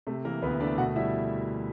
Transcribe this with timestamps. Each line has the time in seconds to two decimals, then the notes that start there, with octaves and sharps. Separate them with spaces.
0.07 C3 A3 A4
0.24 E3 A#3 A#4
0.42 D2 B3 B4
0.60 A3 D4 D5
0.78 B2 F#4 F#5
0.96 G3 E4 E5